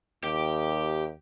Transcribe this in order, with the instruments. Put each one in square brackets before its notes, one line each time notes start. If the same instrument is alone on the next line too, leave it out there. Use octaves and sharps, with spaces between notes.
[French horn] D#2 [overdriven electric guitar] G4